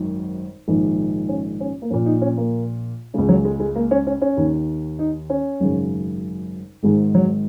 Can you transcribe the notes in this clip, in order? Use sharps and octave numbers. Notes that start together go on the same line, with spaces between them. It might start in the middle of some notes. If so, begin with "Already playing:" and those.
Already playing: G#1 F#2 D#3
A#1 G#2 D#3
C#4
C#4
A#3
A#1 A#2 C#4
D#4
C#4
A#3
C#2 C#3 G#3
F#3
G#3
G#3
A#3
C#4
C#4
C#4
D#2 D#3
D#4
C#4
G#1 F#2 C#3
G#1 G#2 D#3 G#3
F#3